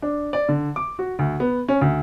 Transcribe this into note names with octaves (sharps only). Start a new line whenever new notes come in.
D4
D5
D3
D6
F#4
D2
B3
C#4
D2